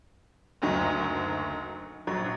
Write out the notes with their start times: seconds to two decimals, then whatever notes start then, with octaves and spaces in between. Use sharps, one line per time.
0.62 F#1 D2 F#3 D#4
2.07 A#1 F#3